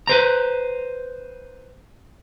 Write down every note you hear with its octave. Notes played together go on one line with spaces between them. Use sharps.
B4 C5 A#5